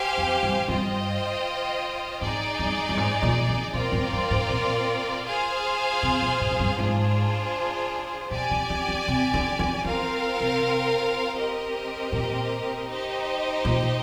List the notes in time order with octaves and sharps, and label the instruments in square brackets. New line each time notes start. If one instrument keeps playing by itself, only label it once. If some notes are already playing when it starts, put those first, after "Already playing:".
Already playing: [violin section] G4 C5 F5 G#5
[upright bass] F2
G2
[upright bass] G2 [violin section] F4 C5 D#5 G5
[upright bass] G#2 [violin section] D#4 G#4 D5
[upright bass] G2
G2
G#2
A#2
D3
[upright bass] A#2 [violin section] C4 F4 A#4 D5
[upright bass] G#2
G2
G#2
A#2
[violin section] F4 G#4 C5 F5 G#5
[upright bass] C3
A#2
G#2
G#2
G2
[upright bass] G#2 [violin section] D4 F4 G#4 C5
[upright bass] A#2 [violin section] G4 D5 G#5
[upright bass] D3
D3
D#3
C3
D3
D3
[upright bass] D#3 [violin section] C4 F4 A#4 F5
[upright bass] C3
[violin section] C4 G4 A#4 D#5
[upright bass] A#2
[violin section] D#4 G4 C5 D#5
[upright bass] A#2